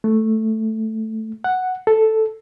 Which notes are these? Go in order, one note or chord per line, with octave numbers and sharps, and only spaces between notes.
A3
F#5
A4